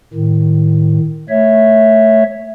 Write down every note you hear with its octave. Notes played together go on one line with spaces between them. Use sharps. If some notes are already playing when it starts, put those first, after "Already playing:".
A2 D#3
A3 C#5 E5